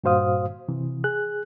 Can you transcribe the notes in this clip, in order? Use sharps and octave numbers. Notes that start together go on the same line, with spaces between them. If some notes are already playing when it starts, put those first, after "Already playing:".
G2 A#2 F#4 C5 F5 D#6
C3 E3
G#4 F#6